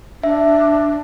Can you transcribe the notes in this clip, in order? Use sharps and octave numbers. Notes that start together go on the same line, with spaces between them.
D4 E5